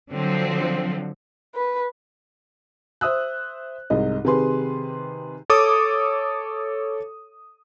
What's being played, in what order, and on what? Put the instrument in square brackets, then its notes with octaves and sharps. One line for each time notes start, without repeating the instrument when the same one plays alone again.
[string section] D3 F3 F#3 C4
[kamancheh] B4
[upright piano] C5 E5 D#6 E6 F#6
C2 G#2 C3 D#5
C3 D#3 G4 G#4 B4 C6
[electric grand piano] A4 C#5 D6 D#6